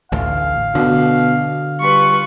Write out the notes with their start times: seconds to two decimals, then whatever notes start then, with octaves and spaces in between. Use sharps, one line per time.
0.12 A1 D2 F5
0.75 B2 D3
1.81 G3 F4 B4 C#6